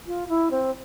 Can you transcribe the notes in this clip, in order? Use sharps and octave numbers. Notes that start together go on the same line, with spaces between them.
F4
E4
C4